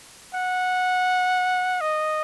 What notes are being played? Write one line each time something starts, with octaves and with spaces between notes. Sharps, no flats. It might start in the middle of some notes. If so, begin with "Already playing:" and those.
F#5
D#5